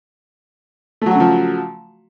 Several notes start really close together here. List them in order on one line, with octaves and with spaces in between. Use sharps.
A3 F#3 F#4 C#3 F3